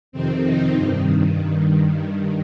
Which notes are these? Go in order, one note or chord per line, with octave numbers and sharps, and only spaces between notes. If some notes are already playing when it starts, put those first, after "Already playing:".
F2 C3 D#3 C4
D#4
G2 D#3